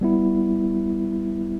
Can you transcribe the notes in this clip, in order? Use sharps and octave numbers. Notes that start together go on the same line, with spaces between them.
G3 B3 E4